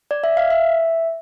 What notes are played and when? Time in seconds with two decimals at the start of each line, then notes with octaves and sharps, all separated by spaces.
0.11 D5
0.24 E5
0.37 F5
0.50 E5